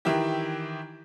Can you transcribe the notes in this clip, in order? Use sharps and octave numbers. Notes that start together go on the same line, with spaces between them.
D#3 E3 E4 G4